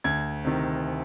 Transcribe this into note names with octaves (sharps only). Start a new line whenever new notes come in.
D2 G#6
C3 D#3